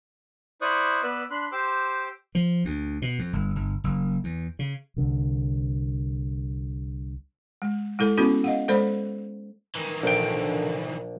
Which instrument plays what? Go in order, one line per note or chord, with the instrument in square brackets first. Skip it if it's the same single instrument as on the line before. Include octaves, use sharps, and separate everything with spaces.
[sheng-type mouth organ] E4 C5 D5 C#6 D#6 F#6
B3 B4 D5 B5 E6
D4 B5 C6 F#6
G4 C5 C6 D6 E6
[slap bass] F3
D2
B2
F2
G1
G1
F#1
E2
C#3
[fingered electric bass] C2 D3
[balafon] G#3
G#3 E4 A4
B3 C#4 E4 F#4 A4
D#5 F5 F#5
G#3 A4 C5 D5 B5
[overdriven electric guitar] D#3 E3
[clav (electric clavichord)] A#1 G5 [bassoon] D3